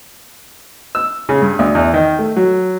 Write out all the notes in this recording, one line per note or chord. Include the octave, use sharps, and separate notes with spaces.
E6
C#3
G2
D2
E2
D#3
A3
F#3